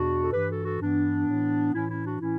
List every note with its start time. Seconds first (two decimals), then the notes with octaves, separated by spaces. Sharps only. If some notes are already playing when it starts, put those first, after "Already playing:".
Already playing: E2 B2 D4 F#4
0.22 A4
0.32 G2 E3 G4 B4
0.48 F#4 A4
0.64 F#4 A4
0.80 G2 E3 B3 D4
1.27 A2 E3
1.73 A2 E3 C#4 E4
1.89 C#4 E4
2.04 D4 F#4
2.20 A2 E3 C#4 E4